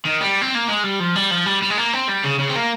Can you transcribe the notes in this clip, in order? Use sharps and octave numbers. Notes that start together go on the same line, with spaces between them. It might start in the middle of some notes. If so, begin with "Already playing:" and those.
D#3
G3
C4
A#3
G#3
G3
F3
G3
F3
G3
G3
G#3
A#3
C4
G3
C#3
C#3
C4
A#3